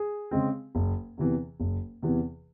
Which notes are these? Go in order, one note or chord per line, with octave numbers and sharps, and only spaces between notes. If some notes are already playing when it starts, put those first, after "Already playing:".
Already playing: G#4
C#3 G#3 C4
F#1
E2 C3 E3
F#1
E2 C3 E3